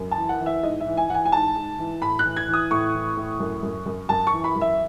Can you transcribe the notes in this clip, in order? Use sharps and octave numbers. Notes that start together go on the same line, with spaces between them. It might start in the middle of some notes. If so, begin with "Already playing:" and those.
Already playing: F#2
A5
E3
F#5
E3
E5
G#2 D#5
E5
E3
G#5
E3 F#5
G#5
G#5
G#2 A5
G#2
E3
A2 B5
F#6
E3
G#6
E3
D#6
A2 C#6
E3
A2
F#2
F#2
F#2
F#2 A5
C#6
E3
B5
F#2
E5